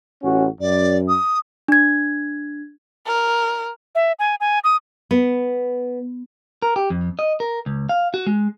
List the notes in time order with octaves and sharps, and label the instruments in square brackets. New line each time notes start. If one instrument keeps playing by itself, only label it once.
[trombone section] A1 C#4 F#4
[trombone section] F#2 [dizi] D5
[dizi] D#6
[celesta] D4 G#6
[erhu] A#4
[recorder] E5
G#5
G#5
D#6
[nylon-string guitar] B3
[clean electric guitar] A#4
G4
F2
D#5
A#4
C#2
F5
F#4
G#3